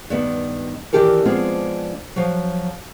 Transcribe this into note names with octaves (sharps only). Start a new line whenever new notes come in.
G2 D#3 B3
D#3 E3 D4 G4 A4 A#4
F3 G#3 B3 C4 D4 F4
F3 F#3